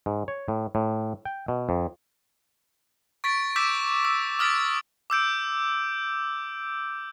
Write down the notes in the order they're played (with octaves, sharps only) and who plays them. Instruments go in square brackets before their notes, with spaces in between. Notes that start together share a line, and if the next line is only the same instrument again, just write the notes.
[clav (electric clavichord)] G#2
C#5
A2
A2
G5
B2
F2
[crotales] C#6 A6 B6 D7
D6 E6 G6 B6 E7
E6
D#6 F6 A6 B6 D7
D6 E6 G6 D7